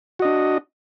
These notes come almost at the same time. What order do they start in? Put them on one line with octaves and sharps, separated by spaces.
F#4 D#5 D4